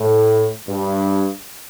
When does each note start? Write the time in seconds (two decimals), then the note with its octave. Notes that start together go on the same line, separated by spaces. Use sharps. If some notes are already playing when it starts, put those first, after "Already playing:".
Already playing: A2
0.68 G2